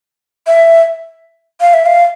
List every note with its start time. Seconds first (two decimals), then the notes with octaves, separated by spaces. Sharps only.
0.47 E5
1.61 F5
1.74 E5
1.86 F5